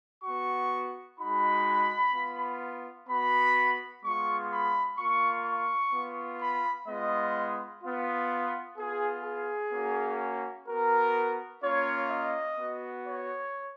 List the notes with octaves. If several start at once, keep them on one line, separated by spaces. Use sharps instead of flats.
B3 F#4 C#6
G#3 D#4 F#4 B5
B3 F4
B3 F#4 B5
G#3 B3 F4 C#6
B5
A#3 F4 C#6
C#6
B3 F4
B5
G#3 B3 F4 D#5
B3 F4
B3 F4 G#4
G#4
A#3 C#4 F#4
B3 F#4 A#4
A#3 C#4 F4 C#5
D#5
B3 F#4
C#5